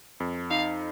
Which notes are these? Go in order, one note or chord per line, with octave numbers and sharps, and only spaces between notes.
F2
D#4 F5